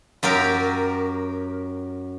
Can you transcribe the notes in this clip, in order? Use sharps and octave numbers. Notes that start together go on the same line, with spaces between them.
F#2 F#3 G4 A#4